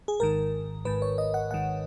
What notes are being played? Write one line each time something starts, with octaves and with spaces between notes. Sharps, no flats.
G#4
G#1 G#2 D#3 A#4
G#1 G#2 D#3 B4
C#5
D#5
F#5
G#1 G#2 D#3 F#5